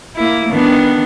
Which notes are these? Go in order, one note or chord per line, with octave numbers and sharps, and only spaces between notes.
A#3 E4
D#3 B3 D4